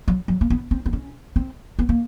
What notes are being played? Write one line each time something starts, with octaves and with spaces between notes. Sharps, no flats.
F#3
F#3
A#3
B3
C4
C4
C#4
C4
B3
A#3